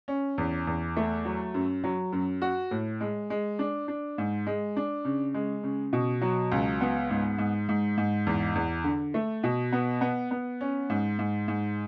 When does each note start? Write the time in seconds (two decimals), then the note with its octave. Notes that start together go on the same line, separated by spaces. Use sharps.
0.08 C#4
0.38 E2
0.67 E2
0.97 A3
1.25 F#3
1.54 F#2
1.84 F#3
2.13 F#2
2.42 F#4
2.71 A2
3.01 G#3
3.30 G#3
3.59 D4
3.88 D4
4.18 G#2
4.47 G#3
4.76 D4
5.05 C#3
5.34 G#3
5.63 C#3
5.93 B2
6.21 F#3
6.52 C#2
6.81 B3
7.10 G#2
7.38 G#2
7.69 G#2
7.97 G#2
8.27 E2
8.55 E2
8.84 D3
9.14 A3
9.44 B2
9.72 B3
10.01 B3
10.31 B3
10.61 C#4
10.90 G#2
11.19 G#2
11.48 G#2